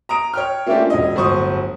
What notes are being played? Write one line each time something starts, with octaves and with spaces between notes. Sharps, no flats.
A#5 D#6 D7
C#5 G5 F6
A3 A#3 C#4 D4 F4 G4
E1 D#5
D1 G1 C5 C#6 D#6